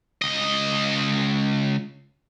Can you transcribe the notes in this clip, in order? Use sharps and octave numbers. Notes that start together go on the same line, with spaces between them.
C#2 D#5